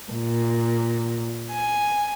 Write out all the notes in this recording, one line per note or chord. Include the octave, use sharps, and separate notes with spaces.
A#2
G#5